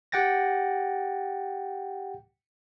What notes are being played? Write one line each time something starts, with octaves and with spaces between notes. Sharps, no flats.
G4 F#5 G5 A6 A#6